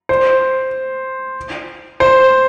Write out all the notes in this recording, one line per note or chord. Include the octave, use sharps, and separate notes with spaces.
C5
C5